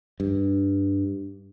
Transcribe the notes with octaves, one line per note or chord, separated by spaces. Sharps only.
G2